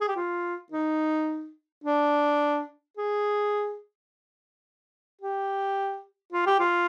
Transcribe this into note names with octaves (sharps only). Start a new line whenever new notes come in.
G#4
G4
F4
D#4
D4
G#4
G4
F4
G4
F4